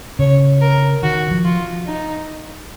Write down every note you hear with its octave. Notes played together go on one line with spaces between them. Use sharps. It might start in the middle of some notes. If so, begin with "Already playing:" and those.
C#3 C#5
A#4
D#3 F#4
F3
F4
D#4